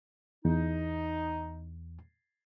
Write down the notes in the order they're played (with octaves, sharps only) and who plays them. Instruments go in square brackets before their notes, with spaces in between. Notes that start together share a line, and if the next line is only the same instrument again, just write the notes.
[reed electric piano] E2 [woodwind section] D#4